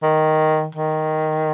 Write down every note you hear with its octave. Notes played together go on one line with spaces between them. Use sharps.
D#3
D#3